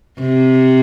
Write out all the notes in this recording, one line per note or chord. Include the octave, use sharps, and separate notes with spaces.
C3